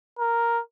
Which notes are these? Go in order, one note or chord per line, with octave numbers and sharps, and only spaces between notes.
A#4